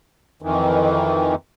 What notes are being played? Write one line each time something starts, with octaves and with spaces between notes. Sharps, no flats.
F2 D#3 E3